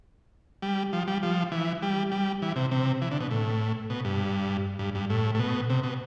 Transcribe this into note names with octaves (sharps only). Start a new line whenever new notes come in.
G3
F3
G3
F3
E3
G3
G3
E3
C3
C3
E3
D3
B2
A2
B2
G2
G2
G2
A2
A2
B2
C3
B2